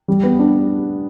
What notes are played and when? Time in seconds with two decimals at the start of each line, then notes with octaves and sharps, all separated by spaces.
0.08 G3
0.23 B3
0.39 D4